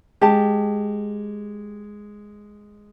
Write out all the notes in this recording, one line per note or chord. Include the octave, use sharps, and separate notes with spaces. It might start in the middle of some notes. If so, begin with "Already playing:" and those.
G#3 G4 A5